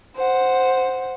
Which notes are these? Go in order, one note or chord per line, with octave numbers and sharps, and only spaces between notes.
C5 F#5